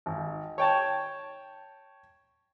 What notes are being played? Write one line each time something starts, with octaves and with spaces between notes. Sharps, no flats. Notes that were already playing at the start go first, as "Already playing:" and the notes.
G#1
C#5 G5 A5